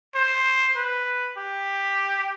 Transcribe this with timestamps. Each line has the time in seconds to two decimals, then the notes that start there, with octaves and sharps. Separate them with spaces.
0.15 C5
0.76 B4
1.37 G4